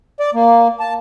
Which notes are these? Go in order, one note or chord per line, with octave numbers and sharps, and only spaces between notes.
D5
A#3
A5